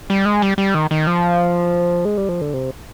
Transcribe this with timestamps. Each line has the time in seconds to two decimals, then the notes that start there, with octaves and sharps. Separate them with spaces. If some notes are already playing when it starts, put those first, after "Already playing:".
0.10 G3
0.25 G#3
0.42 G3
0.58 G3
0.74 D#3
0.91 D#3
1.07 F3
2.05 G#3
2.17 G3
2.29 F3
2.41 D3
2.53 C3